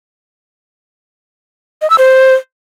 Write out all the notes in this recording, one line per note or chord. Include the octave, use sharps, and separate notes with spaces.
D#5
E6
C5